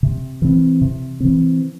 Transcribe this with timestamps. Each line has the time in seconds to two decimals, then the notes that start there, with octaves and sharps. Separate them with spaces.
0.03 C3
0.42 E3 C4
0.81 C3
1.20 E3 C4